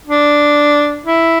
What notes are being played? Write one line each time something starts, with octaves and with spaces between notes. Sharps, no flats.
D4
E4